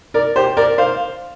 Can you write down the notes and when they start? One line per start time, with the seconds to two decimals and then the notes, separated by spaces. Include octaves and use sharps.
0.14 A#4 D5
0.36 G4 C5
0.57 A#4 D5
0.78 C5 F5